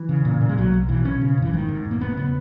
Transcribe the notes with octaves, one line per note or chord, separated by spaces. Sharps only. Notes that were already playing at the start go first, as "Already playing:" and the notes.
Already playing: E3
C#3
A#2
A#2
G#3
B1 F#3
B1
B2 E3
B2 C#4
C#3
F#1 E3
G#2 D#3
G#2
E1
A#3
E1 B3
C#3 B3